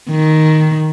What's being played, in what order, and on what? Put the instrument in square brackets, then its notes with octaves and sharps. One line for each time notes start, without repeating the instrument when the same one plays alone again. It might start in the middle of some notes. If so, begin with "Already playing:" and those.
[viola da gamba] D#3